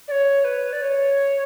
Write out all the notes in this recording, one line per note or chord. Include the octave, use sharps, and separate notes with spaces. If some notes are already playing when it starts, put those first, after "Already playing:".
D5
C#5
B4
D5
C#5